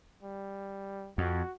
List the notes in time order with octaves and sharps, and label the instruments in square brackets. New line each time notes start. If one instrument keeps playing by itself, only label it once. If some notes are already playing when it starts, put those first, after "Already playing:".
[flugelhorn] G3
[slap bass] F2 [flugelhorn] F#4